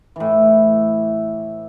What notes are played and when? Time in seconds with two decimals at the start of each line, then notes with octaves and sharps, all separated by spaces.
0.16 A2 E3